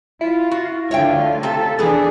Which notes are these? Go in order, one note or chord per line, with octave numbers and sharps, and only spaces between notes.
E4 F4
F#4
D2 D3 F4 C#5 E5 G5
C3 G4 A4
E2 E3 B3 D4 G#4 A4